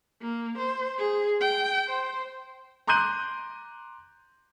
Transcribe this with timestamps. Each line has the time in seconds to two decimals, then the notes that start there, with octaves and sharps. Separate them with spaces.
0.22 A#3
0.58 C5
0.98 G#4
1.40 G5
1.87 C5
2.87 A#5 C6 D6 F#6 G6 D#7